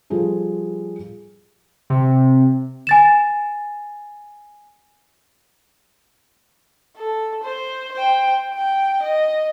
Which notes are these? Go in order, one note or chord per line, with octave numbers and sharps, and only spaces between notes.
F3 G3 F4 G#4 A4
C3
G#5 A6 E7
A4
C5
C5 G5
G5
D#5